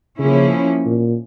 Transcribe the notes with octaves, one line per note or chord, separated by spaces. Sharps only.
C#3 F3 A#3 C#4 E4
A#2